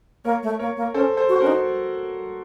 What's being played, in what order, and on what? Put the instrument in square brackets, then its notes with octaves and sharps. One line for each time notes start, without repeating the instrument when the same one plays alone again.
[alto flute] A#3 [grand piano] A#4 C#5
[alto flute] A3
[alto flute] A#3 [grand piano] A#4 C#5
[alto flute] A#3
[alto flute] C#4 [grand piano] A4 C5
[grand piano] A4 C5
[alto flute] F#4
[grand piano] C5
[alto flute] C#4 [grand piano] F#4 A#4
[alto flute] D#4